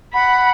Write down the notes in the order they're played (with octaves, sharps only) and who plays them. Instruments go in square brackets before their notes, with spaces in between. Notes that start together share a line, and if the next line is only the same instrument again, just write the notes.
[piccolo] F#5 [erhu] B5